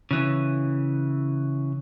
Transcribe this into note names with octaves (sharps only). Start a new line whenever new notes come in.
C#3 E3